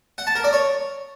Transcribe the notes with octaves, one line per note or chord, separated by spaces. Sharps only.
F#5
A5
A#4
D5
C#5